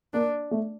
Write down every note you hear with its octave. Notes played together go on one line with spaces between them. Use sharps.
A#3 D4
A3